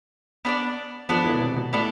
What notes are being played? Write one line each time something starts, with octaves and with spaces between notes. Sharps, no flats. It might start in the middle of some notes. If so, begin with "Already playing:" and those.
B3 D4 A4 D5
F3 B3 D4 A4 D5
E3
B2
C3
B2
A2 B3 D4 A4 D5